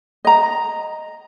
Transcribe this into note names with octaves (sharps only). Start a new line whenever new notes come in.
D#5 A#5